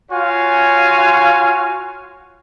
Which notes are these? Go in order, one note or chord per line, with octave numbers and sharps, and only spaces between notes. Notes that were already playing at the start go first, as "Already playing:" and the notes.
F4 F#4 C#5 F5 G#5